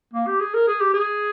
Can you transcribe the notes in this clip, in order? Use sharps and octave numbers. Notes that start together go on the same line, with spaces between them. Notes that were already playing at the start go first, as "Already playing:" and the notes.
A#3
G4
G#4
A#4
G#4
G4
G#4